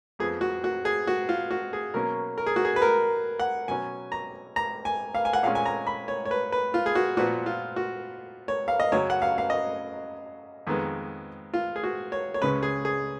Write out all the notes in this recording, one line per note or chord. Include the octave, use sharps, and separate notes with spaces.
F2 F3 B3 G#4
F#4
F#4
G#4
F#4
F4
F#4
G#4
B2 F#3 A#3 C#4 A#4
A#4
G#4
F#4
G#4
B4
A#4
F#5
B2 F#3 C#4 G#5
A#5
A#5
G#5
F5
G#5
F#5
A#2 G#3 C#4 F5
G#5
A#5
B5
C#5
C#5
B4
B4
F4
G#4
F#4
A#2 F3 B3 F#4
F4
F#4
C#5
F5
D#5
F#2 C#3 F#3 C#5
F#5
F5
F5
D#5
F2 D#3 G#3 B3
F4
G#4
F#4
C#5
C#5
C#2 C#3 G#3 C#4 B4
G#4
G#4